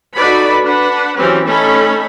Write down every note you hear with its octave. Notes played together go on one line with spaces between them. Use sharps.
D#4 F#4 A4 B4 D5 B5
D4 B4 F#5
E3 F#3 C4 C#4 G4 B4
A3 C#4 D#4 A4 B5